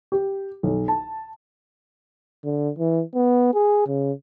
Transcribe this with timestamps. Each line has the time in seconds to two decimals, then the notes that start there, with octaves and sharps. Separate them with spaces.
0.12 G4
0.63 B1
0.88 A5
2.45 D3
2.79 E3
3.15 B3
3.54 G#4
3.87 C#3